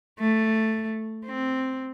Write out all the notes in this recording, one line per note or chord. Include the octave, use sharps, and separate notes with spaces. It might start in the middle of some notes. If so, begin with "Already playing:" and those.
A3
C4